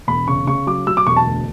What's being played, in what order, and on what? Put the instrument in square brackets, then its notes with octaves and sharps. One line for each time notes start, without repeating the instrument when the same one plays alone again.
[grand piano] E1 B5
C#3 C#6
C#3 C#6
F#3 D6
F#3 E6
D6
E1 C#6
A5
D2